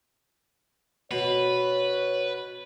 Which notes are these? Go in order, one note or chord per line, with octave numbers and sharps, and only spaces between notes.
B2 B4 C#5